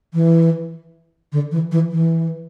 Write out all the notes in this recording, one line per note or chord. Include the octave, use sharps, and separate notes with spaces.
E3
D3
E3
E3
E3